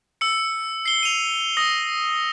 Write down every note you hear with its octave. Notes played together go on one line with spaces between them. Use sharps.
E6 C#7
C7 G7
D#7 F7
D#6 A#6